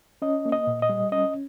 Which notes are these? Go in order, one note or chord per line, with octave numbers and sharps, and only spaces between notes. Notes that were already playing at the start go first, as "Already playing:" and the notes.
C#4 D#5
A#3
D#5
A#2
D#5
G3
C#4 D#5